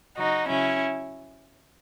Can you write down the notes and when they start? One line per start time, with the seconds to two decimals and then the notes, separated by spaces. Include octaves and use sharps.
0.17 C#3 F#3 D#4 F#4
0.47 C#3 F#3 C#4 E4